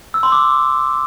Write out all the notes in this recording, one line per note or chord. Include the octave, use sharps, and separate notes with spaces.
E6
C6
D6